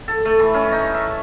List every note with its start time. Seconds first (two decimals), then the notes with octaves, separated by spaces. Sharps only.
0.08 A4
0.25 A3
0.39 E3
0.54 C#4
0.72 D#4
0.94 E5